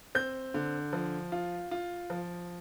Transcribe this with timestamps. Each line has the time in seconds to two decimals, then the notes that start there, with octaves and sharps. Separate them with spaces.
0.15 C4 G6
0.54 D3
0.93 F3
1.32 F4
1.71 F4
2.10 F3